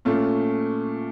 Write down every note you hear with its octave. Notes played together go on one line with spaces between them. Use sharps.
A#2 A3 C#4 F4